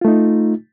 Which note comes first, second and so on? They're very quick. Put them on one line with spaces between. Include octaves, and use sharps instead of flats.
F4 A3 D#4